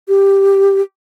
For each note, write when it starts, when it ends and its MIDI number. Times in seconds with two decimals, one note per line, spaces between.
0.08 0.81 67